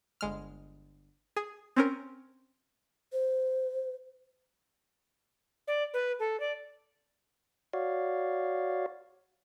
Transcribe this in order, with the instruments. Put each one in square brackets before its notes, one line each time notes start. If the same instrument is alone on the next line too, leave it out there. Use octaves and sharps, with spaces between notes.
[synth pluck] G1 G#3 F6
G#4
C4 C#4 A#4
[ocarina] C5
[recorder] D5
B4
A4
D5
[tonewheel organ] F#4 C#5 D5 F5